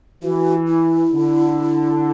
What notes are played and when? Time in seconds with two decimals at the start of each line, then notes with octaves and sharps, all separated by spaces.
0.23 E3 F#4
0.68 E4
1.12 D3